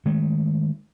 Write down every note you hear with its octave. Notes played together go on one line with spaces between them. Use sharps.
D#3 G#3 A3